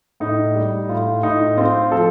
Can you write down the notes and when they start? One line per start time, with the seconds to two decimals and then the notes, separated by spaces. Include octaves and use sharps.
0.20 A2 D#4
0.55 G3
0.89 A2 F4
1.23 A2 D#4
1.58 C4 F4
1.92 F3 A4